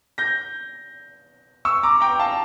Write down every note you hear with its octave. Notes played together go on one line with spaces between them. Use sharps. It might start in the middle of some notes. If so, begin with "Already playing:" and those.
G6 A#6
C#6 E6
A#5 D6
G5 A#5
F5 A5